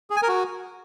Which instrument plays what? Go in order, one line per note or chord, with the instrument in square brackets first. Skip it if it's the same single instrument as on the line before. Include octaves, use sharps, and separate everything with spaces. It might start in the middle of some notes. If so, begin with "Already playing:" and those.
[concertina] G#4
G#5
A#4
F#4